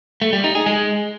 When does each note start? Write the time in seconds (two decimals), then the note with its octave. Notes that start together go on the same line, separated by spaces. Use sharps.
0.22 A3
0.33 G3
0.44 D#4
0.55 G#4
0.66 G#3